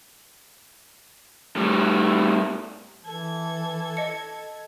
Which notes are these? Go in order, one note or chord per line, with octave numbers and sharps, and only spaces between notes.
A2 G3
E3 A4 G#6
D#5 C#7